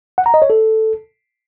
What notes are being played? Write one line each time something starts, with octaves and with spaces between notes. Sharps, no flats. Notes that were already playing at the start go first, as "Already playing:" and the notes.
F#5
A#5
D#5
C#5
A4